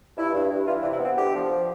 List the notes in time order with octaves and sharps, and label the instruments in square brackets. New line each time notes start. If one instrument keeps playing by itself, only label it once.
[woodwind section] G2 E4
G2
G2
E3 F4
D4
C3
E4
B3 C4
D3 G4
F3